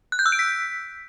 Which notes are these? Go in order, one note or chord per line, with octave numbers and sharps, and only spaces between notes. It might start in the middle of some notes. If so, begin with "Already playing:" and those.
F#6
G6
E6
D7
B6